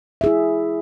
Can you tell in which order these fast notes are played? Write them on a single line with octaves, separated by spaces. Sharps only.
E5 G#4 E4